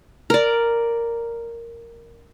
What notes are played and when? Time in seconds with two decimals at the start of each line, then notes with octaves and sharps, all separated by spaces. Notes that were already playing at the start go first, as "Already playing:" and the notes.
0.30 A#4 D5